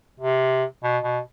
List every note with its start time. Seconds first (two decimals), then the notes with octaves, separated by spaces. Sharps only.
0.20 C3
0.84 B2
1.04 B2